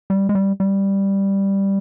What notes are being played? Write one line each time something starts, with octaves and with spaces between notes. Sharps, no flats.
G3
G#3
G3
G3